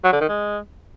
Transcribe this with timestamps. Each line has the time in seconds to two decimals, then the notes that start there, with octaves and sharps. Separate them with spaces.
0.04 F#3
0.12 D3
0.21 D#3
0.29 G#3